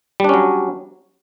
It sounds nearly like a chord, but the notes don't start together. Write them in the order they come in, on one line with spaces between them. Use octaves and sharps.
G3 D4 C#4 F#3